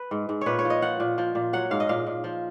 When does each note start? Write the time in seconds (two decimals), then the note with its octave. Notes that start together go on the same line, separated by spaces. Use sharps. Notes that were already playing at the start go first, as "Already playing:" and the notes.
Already playing: B4
0.11 G#2
0.29 G#2
0.41 A#2 B4 C#5
0.59 C#5
0.65 F3
0.70 D#5
0.82 F3 F#5
1.00 A#2
1.18 F3
1.35 A#2
1.53 F#3 F#5
1.71 G#2 F5
1.80 D#5
1.89 A#2 F5
2.07 A#2
2.24 F3